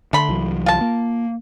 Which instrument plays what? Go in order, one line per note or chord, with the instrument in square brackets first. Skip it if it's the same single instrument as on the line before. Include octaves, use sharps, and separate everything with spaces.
[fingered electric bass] D3 [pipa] A3 B5 C6
[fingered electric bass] C2 E3 F#3
[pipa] F4 A5
[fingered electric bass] A#3